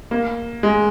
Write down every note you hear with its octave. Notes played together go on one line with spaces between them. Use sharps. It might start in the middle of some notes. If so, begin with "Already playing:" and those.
A#3
G#3